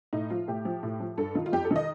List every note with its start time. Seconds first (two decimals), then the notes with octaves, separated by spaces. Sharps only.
0.13 A2 D#4
0.30 F3 F4
0.48 A2 G4
0.65 F3
0.83 A2
1.00 F3
1.17 G2 A4
1.35 D#3 F4
1.46 F4
1.52 F2 G4
1.65 A4
1.71 D#3
1.76 D#5